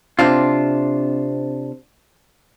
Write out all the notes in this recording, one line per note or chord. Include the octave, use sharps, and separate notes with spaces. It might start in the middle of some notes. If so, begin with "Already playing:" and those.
C3 C4 D4 F4